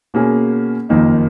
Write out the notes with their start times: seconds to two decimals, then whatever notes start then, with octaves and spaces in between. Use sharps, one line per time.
0.14 B2 A#3 C#4 G#4
0.89 F#1 F2 D#3 A#3 D#4